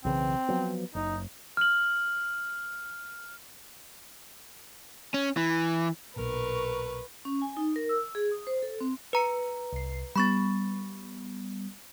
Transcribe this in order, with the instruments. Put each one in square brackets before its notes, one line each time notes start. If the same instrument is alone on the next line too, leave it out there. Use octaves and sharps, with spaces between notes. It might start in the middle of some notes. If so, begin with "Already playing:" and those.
[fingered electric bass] B1 C#3 E3 [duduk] C4
[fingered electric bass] F3 F#3 B3
[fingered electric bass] F#1 [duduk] D#4
[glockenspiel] F6 F#7
[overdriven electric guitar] C#4
E3
[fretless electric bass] B1 A#2 [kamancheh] A#4 C#6 [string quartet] B4
[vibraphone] C#4
G#5
D#4
A#4
E6
G#4
D#6
C5
A4
C4
[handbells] B4 A#5 C#7
[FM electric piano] C2 C7
[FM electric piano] G3 B3 [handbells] B5 C#6 A6